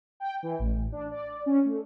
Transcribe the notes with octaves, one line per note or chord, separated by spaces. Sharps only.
G5
E3
A1
D4
D5
C#4
A3